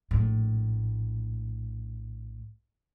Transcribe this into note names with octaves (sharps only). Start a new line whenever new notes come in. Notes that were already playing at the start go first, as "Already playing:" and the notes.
A#1 A2